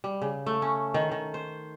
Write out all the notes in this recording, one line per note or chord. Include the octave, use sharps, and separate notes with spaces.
G3
C#3
A3
C#4
D#3
D#3
C5